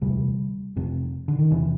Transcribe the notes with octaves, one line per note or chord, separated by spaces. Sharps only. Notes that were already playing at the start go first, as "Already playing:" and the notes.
E1 D2 C3 G3
F1 F2 C3
D3
D#3
E2 C3 E3